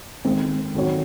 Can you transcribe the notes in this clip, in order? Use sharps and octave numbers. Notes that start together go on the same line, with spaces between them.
D#3 G#3 C4
D#3 F#3 C4 F#4 C#5